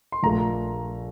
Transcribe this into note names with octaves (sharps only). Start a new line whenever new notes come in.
C6
A#1 A#2 A3 A#5